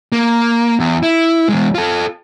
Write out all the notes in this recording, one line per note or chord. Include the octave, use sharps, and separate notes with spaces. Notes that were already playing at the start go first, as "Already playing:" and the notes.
A#3
E2
E4
E2 G#3
F4 A4